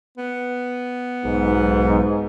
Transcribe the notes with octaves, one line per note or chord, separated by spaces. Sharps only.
B3
B1 G#2